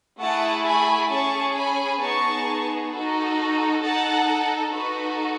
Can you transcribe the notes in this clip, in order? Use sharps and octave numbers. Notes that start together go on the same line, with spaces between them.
A3 E4 G#4 F#5 A5
G#5 B5
C#4 G#4 A5 C#6
G#5 B5
B3 D#4 G#4 A5 C#6
D#4 F#4 A4
D#4 A4 F#5 A5
D#4 F#4 A4 B4